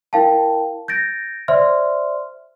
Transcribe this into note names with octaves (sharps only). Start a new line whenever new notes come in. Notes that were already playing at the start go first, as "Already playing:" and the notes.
E4 A#4 F5 G5 A5
G6 A6 A#6 D7
C5 D5 E5 C6 F6